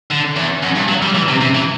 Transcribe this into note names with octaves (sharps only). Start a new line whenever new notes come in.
D3
E2
F#2
G2
F#3
G3
E3
C3
C3
E3